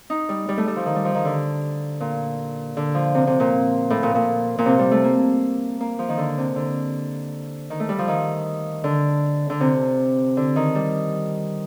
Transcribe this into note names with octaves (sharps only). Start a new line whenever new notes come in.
D#4
G3
G3
A3
G3
F3
D#3
G3
F3
D#3
D3
A#2
D3
F3
C3
C3
A#2
A2
A#2
A#2
A#2
C3
G3
A3
A#3
A#3
F3
D#3
D3
C3
D3
D#3
A3
G3
F3
D#3
D3
D3
C3
D3
D#3
G3